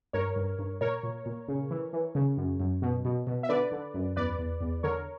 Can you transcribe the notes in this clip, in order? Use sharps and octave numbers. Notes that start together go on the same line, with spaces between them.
G2 A#4 C#5
G2
G2
A#2 A#4 C#5
A#2
A#2
C#3
E3
E3
C#3
F#2
F#2
B2
B2
B2
E5
D3 B4 D5
D3
F#2
E2 B4 D5
E2
E2
D3 A#4 C#5